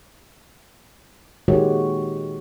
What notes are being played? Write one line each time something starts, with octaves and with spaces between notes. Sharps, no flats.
A#2 D#3 G#3 F#4 G4 C#5